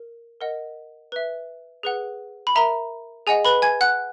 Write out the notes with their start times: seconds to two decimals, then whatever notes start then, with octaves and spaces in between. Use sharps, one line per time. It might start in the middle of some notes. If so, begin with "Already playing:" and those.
Already playing: A#4
0.41 A#4 D#5 F#5
1.12 B4 E5
1.83 G#4 B4 F#5
2.47 B5
2.56 A#4 E5 A#5
3.27 G#4 D#5 F#5 G#5
3.45 B4 B5
3.62 G#5 G#6
3.81 F#5 F#6